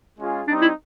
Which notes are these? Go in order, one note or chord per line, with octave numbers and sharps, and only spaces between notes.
G#3 C#4 F4 G#4
G3 C4 D4 D#4
E4